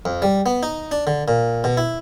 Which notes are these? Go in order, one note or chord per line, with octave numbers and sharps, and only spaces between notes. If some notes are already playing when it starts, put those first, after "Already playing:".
F2
G3
B3
D#4
D4
D3
A#2
B2
E4